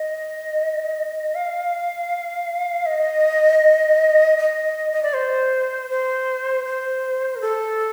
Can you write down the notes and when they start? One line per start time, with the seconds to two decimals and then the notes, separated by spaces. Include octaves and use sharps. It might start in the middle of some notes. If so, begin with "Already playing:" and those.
Already playing: D#5
1.35 F5
2.86 D#5
4.38 D#5
4.92 D#5
5.03 D5
5.14 C5
5.90 C5
6.65 C5
7.36 A#4
7.41 A4